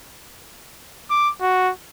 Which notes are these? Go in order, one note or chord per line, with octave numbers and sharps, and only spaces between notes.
D6
F#4